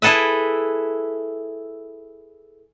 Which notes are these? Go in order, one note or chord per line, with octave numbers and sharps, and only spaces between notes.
E4 G#4 A4 B4 E5